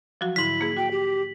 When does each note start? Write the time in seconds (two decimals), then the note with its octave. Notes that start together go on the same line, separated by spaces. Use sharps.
0.21 F3 F#3 F#4
0.36 G#2 D3 E4 B6 F#7
0.61 A#3 G#4
0.77 F#4 G5
0.91 G4